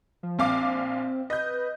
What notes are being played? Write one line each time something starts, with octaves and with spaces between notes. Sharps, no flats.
F3
A#1 C4 F5 D6
B4 D#5 G6